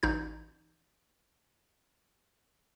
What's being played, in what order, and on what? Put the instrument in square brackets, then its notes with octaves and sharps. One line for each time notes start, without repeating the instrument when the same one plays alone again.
[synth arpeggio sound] A1 D#4 G6